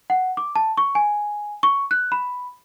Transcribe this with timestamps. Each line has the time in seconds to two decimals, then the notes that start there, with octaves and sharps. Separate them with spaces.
0.10 F#5
0.37 D6
0.56 A5
0.78 C#6
0.95 G#5
1.63 C#6
1.91 F#6
2.12 B5